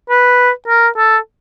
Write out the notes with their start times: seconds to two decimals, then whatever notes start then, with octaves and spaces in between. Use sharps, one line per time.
0.10 B4
0.68 A#4
0.97 A4